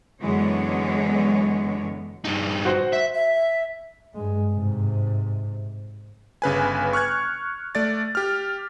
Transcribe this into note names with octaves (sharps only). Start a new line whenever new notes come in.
F#2 D3 E3 G#3 B3 C#5
G2 D#4
F#4 C5 F#5
E5
E5
G2 G#3
G#2 C3
G1 C#3 B4 G#5
C#6 F6 F#6 G#6
A3 D5 A6
G4 F6